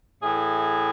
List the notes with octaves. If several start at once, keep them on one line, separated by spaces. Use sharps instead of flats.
A2 G#4
E3